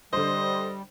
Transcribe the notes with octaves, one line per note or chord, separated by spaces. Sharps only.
D3 G3 C5 D#5